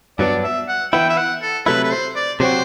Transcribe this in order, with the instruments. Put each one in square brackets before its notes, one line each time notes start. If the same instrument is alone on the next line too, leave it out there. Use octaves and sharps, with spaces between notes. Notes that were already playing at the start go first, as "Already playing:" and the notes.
[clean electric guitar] G2 F#3 B3 D4 [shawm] D5
[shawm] E5
F#5
[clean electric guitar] E3 B3 E4 [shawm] G5
[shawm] E5
F#5
A4
[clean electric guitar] C3 F#3 A3 E4 [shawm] B4
[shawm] B4
C5
D5
[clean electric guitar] C3 F#3 C4 F#4 [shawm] C5